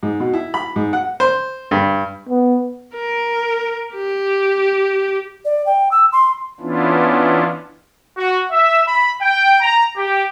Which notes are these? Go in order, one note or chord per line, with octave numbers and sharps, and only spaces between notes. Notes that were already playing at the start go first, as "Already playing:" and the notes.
G#2
B2
E4
B5
G#2
F#5
C5
G2
B3
A#4
G4
D5
G5
E6
C6
E3 B3 C#4 D4 E4 F4
F#4
E5
B5
G5
A#5
G4